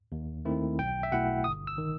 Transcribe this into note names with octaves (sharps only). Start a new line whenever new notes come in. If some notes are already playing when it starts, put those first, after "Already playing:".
D#2
D#3 A3 C4 E4
B1 G5
E5
B2 A3 E4 F#5
G1 D#6
E6
D#3